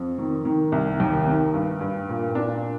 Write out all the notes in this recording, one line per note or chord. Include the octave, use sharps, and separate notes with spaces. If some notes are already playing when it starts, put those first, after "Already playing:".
Already playing: F2
D#3
D#3
C2
D#2
D#3
G2
G2
A#2
D4